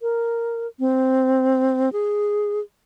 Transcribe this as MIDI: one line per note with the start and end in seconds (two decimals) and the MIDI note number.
0.02 0.67 70
0.79 1.89 60
1.93 2.60 68